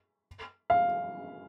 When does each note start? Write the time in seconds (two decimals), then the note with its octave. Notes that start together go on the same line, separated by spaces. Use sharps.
0.70 F5